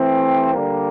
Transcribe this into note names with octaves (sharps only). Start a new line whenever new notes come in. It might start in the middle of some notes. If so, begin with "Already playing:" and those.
Already playing: E3 A3 C4
G4
D3 G3 A#3